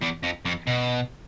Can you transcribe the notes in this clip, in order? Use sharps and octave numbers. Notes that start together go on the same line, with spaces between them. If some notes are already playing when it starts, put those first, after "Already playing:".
E2
F2
F2
B2